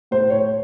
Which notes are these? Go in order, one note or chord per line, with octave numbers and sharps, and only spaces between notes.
A2 C5
C#5